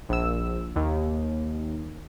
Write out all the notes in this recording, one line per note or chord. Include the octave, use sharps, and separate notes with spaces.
A#1 E6
D#2